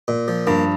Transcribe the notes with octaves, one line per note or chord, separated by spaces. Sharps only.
A#2
F3
G2 A#3